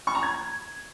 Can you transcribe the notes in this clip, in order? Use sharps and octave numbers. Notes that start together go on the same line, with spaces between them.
C#6
A#5
G#6